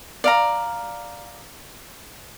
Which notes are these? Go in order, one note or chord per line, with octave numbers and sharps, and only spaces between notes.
D5 F5 A#5